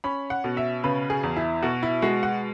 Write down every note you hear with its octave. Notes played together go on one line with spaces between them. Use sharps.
C#4 B5
F#5
B2
E5
C#3 B4
G#4
E2
E4
B2 F#4
E4
G#3 F#4
F#5